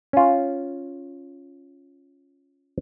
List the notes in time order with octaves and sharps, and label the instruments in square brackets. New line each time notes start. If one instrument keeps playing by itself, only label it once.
[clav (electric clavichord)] C#4 F4